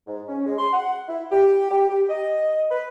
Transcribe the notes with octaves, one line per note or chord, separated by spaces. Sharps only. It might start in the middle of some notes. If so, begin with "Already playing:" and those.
G#2
C#4
G#3
C6
F#5
E4
G4
G4
G4
D#5
B4